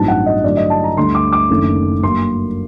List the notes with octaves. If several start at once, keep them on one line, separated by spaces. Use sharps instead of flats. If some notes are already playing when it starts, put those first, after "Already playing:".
Already playing: A1 G2 F#3 C4 D#4 A5
F#5
D#5
G2 D3 F#3 A3 D5
D#5
A5
A#5
D2 D3 G3 C6
D6
D6
F#1 F#2 D#3 A3 D4
G2 F#3 A#3 C6